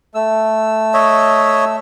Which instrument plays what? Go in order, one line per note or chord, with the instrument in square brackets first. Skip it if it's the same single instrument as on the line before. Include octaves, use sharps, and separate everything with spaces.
[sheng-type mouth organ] A3 E6
[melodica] C#5 D#5 E5